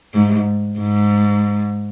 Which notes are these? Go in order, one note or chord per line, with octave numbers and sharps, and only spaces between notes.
G#2
G#2